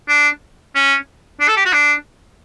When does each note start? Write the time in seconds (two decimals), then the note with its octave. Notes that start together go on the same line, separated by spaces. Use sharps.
0.08 D4
0.75 C#4
1.40 D4
1.48 A4
1.57 G4
1.65 F#4
1.73 D4